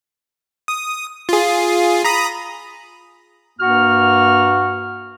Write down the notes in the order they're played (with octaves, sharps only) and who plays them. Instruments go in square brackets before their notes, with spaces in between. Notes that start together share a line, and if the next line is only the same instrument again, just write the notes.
[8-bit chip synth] D#6
F4 G#4
A#5 B5 D#6
[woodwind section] G2 A#3 F#4 F#5 F6